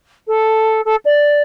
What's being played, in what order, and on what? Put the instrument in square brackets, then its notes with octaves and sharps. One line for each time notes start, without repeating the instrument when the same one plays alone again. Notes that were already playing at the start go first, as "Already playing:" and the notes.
[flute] A4
A4
D5